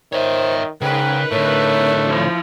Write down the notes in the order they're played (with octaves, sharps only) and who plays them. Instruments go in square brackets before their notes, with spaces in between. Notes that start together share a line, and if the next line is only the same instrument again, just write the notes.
[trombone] D#3 [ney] C5 [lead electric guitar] C#5 E5
[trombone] G#2 [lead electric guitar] C#3 [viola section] D#4 A#4 B4 [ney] G5
[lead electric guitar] A2 D3 [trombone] A3 [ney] C#5
[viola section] F3 E4